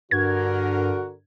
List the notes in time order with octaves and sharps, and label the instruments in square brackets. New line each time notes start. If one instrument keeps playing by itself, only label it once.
[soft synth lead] G2 [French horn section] D3 A#4 [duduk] F#4 [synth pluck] G#6